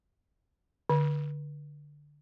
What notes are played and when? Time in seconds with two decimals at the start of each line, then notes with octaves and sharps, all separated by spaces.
0.90 D3